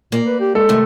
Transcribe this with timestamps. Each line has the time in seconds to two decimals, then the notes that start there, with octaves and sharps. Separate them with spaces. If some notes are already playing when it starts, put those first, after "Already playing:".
0.12 A#2 A#3 D5
0.25 B4
0.40 G4
0.55 G#3 A4
0.69 C3 D#3 A3